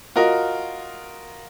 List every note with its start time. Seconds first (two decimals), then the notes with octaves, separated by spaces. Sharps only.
0.16 F4 F#4 A#4 D#5